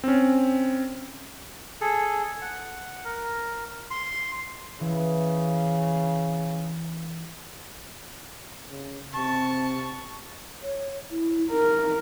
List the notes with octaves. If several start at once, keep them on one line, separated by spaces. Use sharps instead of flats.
C4 C#4
G#4 A4
F#5
A#4
C6
C#3 E3
C#3
C3 A5 C#6
C#5
E4
D#4 A#4